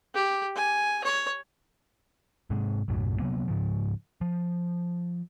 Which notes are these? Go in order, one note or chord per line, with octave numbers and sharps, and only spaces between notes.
G4
G#5
C#5
G#2 C3 G#3
B1 F#2 A2 F#3
C3 F#3 A#3 B3
G#2 C#3 F3
F3